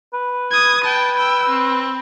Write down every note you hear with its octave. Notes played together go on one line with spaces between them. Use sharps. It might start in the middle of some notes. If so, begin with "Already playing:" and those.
B4
D#6 G#6
G5 A5
G5 E6
C4